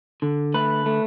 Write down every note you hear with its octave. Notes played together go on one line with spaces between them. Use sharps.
D3
A3 B4
A3